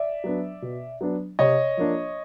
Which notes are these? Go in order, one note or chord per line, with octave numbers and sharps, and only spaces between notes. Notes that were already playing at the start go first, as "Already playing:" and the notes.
Already playing: D5 E5
F#3 B3 D4
B2
F#3 B3 D4
C3 C#5 D#5
F3 A#3 D4